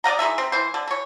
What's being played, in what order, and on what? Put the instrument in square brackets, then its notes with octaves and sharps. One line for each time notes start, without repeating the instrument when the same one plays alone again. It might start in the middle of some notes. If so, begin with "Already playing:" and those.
[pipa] D5 D#5 F#5 A#5
E3 G#3 D#4 E5
C4
E3 C5
D3
E3 C#5